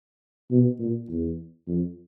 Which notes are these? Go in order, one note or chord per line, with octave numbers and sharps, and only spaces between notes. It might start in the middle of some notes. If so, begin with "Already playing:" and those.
B2
A#2
E2
F2